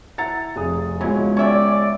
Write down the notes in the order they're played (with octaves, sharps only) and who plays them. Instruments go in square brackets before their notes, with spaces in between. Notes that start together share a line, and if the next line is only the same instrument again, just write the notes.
[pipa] E4 F#5 A#5 [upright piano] A6
[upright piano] F1 G#4 D#6
[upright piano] C#2 B2 G#3 [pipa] F#3 C#4 E4
[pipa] C#4 E5 G5 [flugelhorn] D5